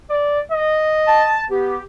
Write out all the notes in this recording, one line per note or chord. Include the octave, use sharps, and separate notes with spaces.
D5
D#5
A5
B3 G4